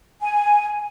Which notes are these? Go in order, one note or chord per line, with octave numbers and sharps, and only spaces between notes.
G#5